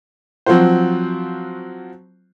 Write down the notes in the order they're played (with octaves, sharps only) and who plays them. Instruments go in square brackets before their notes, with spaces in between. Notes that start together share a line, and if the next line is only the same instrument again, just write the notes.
[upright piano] F3 F#3 C4 F4 F#4 C5